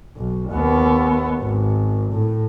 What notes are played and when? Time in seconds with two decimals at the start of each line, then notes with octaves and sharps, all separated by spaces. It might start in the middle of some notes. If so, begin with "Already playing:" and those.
0.17 B1
0.51 D#2 B3
1.42 G#1
2.13 A2